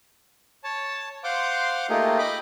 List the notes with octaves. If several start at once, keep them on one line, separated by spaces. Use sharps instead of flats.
C#5 A5
C5 F5 F#5 C6 D6
A3 A#3 D#4 F4 G4 G#4
D#5 G5 B5 D6